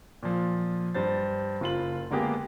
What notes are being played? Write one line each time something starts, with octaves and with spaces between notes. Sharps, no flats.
A#2 F3
G2 C5 A6
F#1 F4 F#7
D3 G#3 A#3 B3 G4 G#4